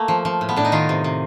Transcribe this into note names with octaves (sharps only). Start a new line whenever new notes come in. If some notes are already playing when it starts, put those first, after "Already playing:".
Already playing: A3 A#3
F3
F3
A2
B3
A2 D4
D#4
D#3 F4
C3
C3